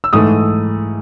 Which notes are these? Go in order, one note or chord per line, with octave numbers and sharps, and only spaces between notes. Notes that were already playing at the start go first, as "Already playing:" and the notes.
E6
G#2 E3 A3 D#6